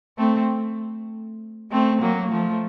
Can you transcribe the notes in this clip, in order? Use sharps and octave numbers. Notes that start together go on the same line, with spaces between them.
A3 C4
A3 C4
F#3 A#3
F3 A3